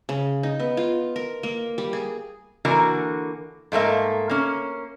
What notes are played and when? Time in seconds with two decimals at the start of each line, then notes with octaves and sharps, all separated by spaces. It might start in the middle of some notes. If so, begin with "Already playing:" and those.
0.09 C#3
0.43 D#4
0.60 B3
0.77 F4
1.16 A#4
1.43 A#3
1.78 G3
1.93 G#4
2.65 D3 E3 A#3 F#4 A#4
3.72 G#2 A3 A#3 E5
4.29 A#3 C#4